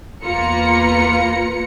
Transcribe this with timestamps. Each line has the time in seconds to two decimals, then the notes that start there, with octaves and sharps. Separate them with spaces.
0.24 E2 A#3 F4 B4 A#5 C#7